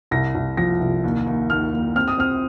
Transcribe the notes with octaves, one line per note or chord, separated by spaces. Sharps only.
C2 A#6
C2
F3 A#6
C2
D#2
D#2
D#2 F6
D#2
C4 F6
D#6
C4 F6